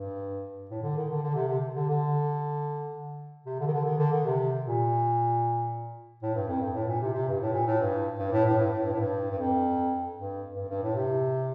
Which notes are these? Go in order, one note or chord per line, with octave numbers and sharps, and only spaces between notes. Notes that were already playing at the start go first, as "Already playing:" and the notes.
Already playing: G2
A2
D3
D#3
D3
D3
C3
C3
D3
D3
C3
D3
D#3
D3
D#3
D3
D#3
C3
A#2
A2
G2
F2
G2
A2
A#2
C3
C3
G2
A2
A#2
A2
G2
G2
A2
A2
G2
A2
G2
A2
G2
G2
F2
G2
G2
G2
A2
C3